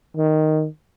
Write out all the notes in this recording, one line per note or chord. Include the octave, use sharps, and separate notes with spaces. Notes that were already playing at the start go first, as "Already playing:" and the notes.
D#3